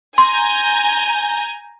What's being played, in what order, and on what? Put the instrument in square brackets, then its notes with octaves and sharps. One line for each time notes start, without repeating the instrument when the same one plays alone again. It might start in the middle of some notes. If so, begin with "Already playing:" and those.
[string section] G#5 A#5 G6 [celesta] C6